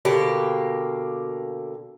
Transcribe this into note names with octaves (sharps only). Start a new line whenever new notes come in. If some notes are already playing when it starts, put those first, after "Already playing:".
B2 D3 A#3 G4